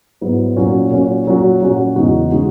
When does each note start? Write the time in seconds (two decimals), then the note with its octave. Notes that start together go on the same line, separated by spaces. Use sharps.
0.21 G#2 F#3 B3 E4
0.56 A#2 F#3 C#4 F#4
0.91 A#2 F#3 C#4 F#4
1.27 A#2 F#3 C#4 F#4
1.61 A#2 F#3 C#4 F#4
1.96 E2 C#3 G#3 D#4 F#4
2.31 C#3 G#3 D#4 F#4